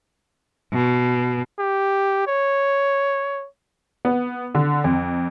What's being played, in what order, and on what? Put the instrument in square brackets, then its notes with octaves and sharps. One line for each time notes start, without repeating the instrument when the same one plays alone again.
[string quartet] B2
[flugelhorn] G4
C#5
[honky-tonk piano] B3
D3
F2